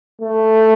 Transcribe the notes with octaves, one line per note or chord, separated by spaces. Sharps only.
A3